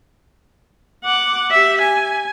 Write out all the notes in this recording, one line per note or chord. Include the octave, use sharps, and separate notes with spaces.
F#5 D6
G4 E5
G#5